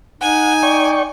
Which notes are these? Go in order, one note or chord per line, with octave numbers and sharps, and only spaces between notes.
D#4 F#5 G#5
D5 G5 C#6